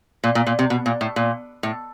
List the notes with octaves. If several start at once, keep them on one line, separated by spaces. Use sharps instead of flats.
A#2
A#2
A#2
C3
B2
A#2
A2
A#2
A2